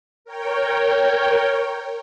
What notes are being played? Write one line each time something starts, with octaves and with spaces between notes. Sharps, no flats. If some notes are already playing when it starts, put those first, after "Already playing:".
A#4 C#5 G5